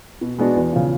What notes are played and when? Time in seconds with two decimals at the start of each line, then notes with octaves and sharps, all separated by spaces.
0.21 B2
0.39 G#3 B3 D4 F#4
0.56 E2
0.73 C#3 F3